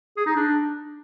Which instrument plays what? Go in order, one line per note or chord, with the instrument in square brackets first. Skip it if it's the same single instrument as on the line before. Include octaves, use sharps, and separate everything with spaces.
[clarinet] G#4
D#4
D4